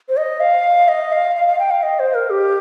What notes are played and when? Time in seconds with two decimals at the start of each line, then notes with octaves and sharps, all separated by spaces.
0.09 C5
0.17 D#5
0.40 F5
0.88 D#5
1.12 F5
1.36 F5
1.48 F5
1.59 G5
1.71 F5
1.83 D#5
1.99 C5
2.15 A#4
2.30 G4